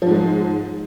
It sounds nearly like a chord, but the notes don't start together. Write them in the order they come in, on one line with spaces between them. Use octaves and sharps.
F3 G#2 G#3